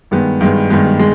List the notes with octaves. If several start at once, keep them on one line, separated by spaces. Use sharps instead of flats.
G2 D#3 G#3 B3
G2 D#3 G#3 B3
G2 D#3 G#3 B3
G#3